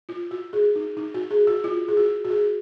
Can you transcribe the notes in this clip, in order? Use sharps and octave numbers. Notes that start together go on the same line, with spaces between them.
F4
F#4
G#4
D#4
D#4
F#4
G#4
F#4
F4
G#4
F#4
F#4
G#4